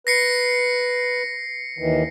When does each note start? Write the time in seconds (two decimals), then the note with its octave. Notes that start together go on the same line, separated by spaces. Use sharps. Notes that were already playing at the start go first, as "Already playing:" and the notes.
0.07 B4 A#6 C7 C#7
1.79 D#2 D#3 E3